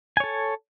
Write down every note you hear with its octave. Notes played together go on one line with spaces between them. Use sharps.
A4 C#5 G#5